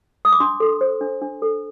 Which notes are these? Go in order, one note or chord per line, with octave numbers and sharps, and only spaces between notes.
D#6
D6
D4 C6
A4
C5
D4
D4
A4